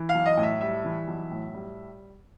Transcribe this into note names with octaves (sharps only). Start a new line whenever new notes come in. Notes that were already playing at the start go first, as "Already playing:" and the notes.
Already playing: E3
F5
B1
D#5
A2
E5
G3 E5
E3
B1
A2
G3